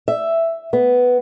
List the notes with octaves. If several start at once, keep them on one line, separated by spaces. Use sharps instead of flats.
E5
B3